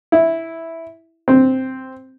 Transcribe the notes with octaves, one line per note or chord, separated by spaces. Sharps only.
E4
C4